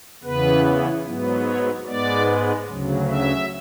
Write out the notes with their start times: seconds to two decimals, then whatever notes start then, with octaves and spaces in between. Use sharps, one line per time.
0.23 E2 C#3 E3 B3 B4
1.05 G#2 F#3 B3
1.46 C#5
1.86 G#2 G#3 B3 D5
2.68 D2 C#3 F#3
3.09 E5